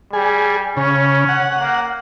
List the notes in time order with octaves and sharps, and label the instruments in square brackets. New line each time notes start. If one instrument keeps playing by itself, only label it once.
[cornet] G3 [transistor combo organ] G#4
[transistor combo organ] C#3 [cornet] C#4
[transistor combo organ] F#5
[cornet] A#3